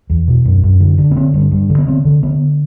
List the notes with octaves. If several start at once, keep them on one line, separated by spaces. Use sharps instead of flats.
E2
B2
F#2
F#2
D3
D3
B3
D3 C4
G2
G2
D3
B3
D3 C4
D3
D3 B3